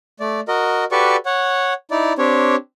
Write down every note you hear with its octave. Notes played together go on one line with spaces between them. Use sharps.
A3 D5
F#4 A#4 D#5
F#4 G4 A4 B4 D5 C#6
C#5 F#5
D#4 E4 D5
C4 D4 G4 C#5